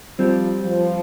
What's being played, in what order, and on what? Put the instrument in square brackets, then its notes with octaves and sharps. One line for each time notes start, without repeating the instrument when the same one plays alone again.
[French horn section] F3 [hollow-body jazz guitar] G3 C4 G4
[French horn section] F3